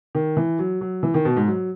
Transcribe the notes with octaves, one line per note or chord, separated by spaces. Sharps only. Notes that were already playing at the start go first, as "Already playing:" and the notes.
D#3
E3
F#3
F#3
E3
D#3
B2
G#2
F#3